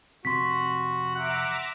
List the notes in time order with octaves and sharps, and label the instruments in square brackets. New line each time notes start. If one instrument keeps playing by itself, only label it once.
[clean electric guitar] F2 C3 [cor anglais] F#4 [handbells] C6 B6
[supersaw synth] E5 A#5 D6 [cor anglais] F#5